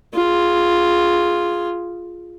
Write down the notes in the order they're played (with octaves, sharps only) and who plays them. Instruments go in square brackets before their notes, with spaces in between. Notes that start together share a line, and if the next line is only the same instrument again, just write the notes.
[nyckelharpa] F4 G#4